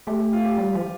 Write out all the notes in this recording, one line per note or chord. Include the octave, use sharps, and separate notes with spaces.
A3 G4
G4
F4
G4
G3
F3